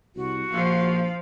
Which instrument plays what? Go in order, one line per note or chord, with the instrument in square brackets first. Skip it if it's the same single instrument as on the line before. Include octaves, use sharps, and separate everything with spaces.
[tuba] C2 [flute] F#4
[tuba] A#1 [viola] F3 F5